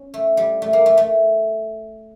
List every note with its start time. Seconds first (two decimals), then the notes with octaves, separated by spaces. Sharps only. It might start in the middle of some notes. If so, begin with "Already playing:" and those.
Already playing: C#4
0.14 A3
0.37 G3
0.62 A3
0.73 A#3
0.86 A3
0.97 A3